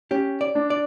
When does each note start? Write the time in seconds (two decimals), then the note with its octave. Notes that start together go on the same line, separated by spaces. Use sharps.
0.11 C#4 G4
0.41 D5
0.55 D4
0.70 D5